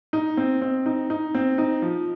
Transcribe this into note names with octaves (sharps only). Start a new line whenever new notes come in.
D#4
C4
C4
D#4
D#4
C4
D#4
F3